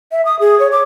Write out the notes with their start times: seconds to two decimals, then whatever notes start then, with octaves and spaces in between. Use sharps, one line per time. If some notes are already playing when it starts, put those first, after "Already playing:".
0.12 E5
0.25 D#6
0.40 G#4
0.60 C#5
0.72 D6